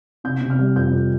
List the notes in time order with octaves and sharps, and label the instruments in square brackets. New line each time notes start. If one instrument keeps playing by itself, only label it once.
[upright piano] C3 G6
C3
F6
G3
F2 G6
F2